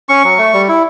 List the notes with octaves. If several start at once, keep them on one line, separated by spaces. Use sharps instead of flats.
C#4 C#6
F#3
A3
G3
E4